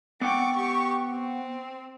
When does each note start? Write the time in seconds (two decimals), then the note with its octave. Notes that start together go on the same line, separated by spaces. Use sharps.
0.21 B3 F#5 G5 C#6 D6
0.55 G4 C#6
1.12 C4